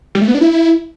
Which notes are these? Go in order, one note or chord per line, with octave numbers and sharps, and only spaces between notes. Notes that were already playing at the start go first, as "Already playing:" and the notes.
G3
A3
B3
D4
E4